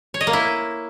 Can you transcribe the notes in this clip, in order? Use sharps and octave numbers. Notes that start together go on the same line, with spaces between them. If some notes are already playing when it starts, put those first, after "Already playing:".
C#5
D#5
A#3
E4